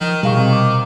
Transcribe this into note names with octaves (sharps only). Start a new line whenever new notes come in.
D#3 F3
B2 D#3 G3 G#4 F5 C#6
C3
D6